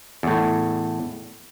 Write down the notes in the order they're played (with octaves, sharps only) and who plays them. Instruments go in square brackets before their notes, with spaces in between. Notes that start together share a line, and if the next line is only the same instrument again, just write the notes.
[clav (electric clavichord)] E2 A2